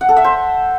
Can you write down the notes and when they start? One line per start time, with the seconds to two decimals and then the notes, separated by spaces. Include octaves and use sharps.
0.01 F#5
0.09 A4
0.17 E5
0.24 C5